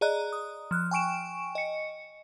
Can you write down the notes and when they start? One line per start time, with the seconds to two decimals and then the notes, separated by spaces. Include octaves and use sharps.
0.01 G#4 D5 D#5 A#5 F#6
0.33 D#6
0.71 F3 F6 F#6
0.91 G5 G#5 C#6 D7 E7
1.55 D#5 C#7